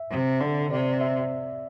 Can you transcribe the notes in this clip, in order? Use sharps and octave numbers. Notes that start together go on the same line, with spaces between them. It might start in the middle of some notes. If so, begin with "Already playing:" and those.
Already playing: E5
C3
D3
C3 D5
E5